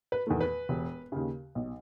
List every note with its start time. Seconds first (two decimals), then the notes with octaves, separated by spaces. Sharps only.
0.12 B4
0.27 E2 D#3 A3
0.41 B4
0.69 E1
1.12 D#2 C#3
1.55 B1